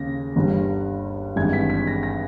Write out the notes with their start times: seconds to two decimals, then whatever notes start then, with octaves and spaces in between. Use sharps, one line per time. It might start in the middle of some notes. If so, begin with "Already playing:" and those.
Already playing: D#2 C#3 A#6
0.36 G1 G2 G3
1.36 G#1 G2 E3 G#3 G#6
1.53 B6
1.70 B6
1.87 A#6
2.03 A#6